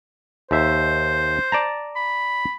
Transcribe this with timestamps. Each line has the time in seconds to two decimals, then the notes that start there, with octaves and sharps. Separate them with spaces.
0.51 D#2 C5 E5
1.52 D5 A5 A#5
1.95 B5